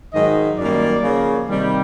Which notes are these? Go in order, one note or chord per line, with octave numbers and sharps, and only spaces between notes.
G#2 D#3 F#3 D#5
F#2 D#3 G3 A#3 D5
C#3 F3 A#3
C3 D#3 G3